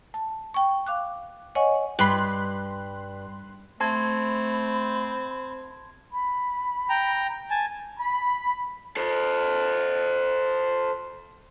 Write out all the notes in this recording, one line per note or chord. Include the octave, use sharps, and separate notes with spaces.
A5
G5 C#6
F5 D6 F#6
C#5 D#5 F#5 G#5 C#6
G2 B5 C6 F#6
A3 C4 A5 B5 C6 G#6
B5
G5 A#5
G#5 A5
B5
A4 C5